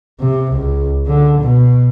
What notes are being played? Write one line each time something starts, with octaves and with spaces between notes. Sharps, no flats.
C3
C#2
D3
B2